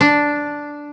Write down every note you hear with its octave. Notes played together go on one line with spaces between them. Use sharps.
D4